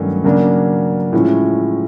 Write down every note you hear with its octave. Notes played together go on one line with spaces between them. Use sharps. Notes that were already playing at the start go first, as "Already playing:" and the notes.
Already playing: G2 D#3 F#3 A3 C#4
C#3 F#3 A#3 D4
A2 F3 G#3 C#4 E4